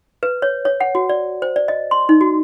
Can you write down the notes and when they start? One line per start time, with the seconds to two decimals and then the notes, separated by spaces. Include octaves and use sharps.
0.23 B4
0.42 C#5
0.65 C#5
0.80 F#5
0.95 F#4
1.09 D5
1.42 C5
1.56 D5
1.68 D#5
1.91 C6
2.09 D#4
2.21 F#4